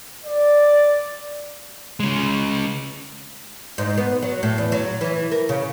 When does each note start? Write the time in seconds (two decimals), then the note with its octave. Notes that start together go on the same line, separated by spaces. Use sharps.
0.24 D5
2.00 C#3 G#3
3.78 G#2
3.97 B3
4.22 F#3
4.43 A2
4.58 E2
4.72 F#3
5.01 E3
5.32 A#4
5.49 C#3